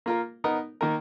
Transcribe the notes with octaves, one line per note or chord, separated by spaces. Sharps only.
A#3 F4 A#4
B3 D#4 A#4 D#5
D#3 A#3 D#4 A#4